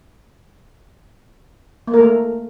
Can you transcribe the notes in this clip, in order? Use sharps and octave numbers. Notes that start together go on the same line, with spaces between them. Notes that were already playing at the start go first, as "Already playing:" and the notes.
A#3
A#4
A3